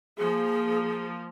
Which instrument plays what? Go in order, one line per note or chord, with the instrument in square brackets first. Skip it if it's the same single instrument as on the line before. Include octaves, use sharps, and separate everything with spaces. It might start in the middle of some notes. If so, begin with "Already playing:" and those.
[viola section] F3 A#3 [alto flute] G#4